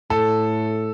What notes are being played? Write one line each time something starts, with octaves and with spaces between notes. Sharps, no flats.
A2 A4